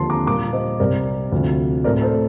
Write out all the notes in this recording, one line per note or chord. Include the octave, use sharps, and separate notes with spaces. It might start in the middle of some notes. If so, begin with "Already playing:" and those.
Already playing: D#2 D3 F3 C4 A5 C6
A#5 D6
A#2 G3 A#3 A#5 D6
C5 D#5
C2 C3 G3 C4 A#4 D5
D2 C3 F3
A2 A3 C4 A#4 D5
A4 C5